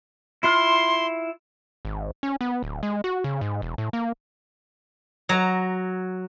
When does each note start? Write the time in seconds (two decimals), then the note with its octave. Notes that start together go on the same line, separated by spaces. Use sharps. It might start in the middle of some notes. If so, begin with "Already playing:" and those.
0.43 E4 F4 C6 F6
1.85 G#1
2.23 C#4
2.41 B3
2.63 D1
2.83 G#3
3.04 F#4
3.24 C#3
3.41 G#2
3.62 E1
3.78 A2
3.93 A#3
5.29 F#3 A#5